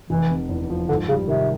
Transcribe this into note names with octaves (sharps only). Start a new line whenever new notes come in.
F1 E3
C3
E2
F3
G#2 D3
C#3 G3
C3 D#3